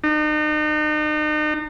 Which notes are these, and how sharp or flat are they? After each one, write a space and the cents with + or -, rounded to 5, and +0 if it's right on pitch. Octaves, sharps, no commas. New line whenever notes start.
D#4 -40